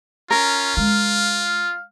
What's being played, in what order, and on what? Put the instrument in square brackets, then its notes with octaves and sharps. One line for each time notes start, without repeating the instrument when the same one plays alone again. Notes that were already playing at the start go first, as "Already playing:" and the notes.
[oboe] C#4 [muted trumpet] F4 [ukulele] A#4
[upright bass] G#3 [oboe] F5